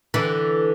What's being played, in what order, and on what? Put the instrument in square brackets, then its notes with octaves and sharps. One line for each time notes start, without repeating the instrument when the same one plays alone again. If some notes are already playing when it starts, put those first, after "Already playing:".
[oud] D3 E3